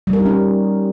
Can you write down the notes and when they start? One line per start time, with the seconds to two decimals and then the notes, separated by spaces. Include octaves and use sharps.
0.07 G3
0.13 A#4
0.19 D#4
0.25 C#4